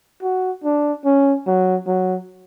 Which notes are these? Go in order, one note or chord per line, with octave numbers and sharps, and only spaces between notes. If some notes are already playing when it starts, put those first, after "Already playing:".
F#4
D4
C#4
F#3
F#3